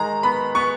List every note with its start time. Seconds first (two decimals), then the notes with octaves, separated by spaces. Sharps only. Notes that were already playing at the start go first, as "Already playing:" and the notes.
Already playing: D#3 G#3 A#5
0.23 B3 B5
0.55 B3 C#6